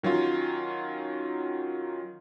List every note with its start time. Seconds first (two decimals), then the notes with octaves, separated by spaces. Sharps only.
0.03 D#3 F#3 C#4 F4